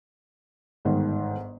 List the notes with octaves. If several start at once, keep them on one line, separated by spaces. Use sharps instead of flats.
G1 G#2 D#3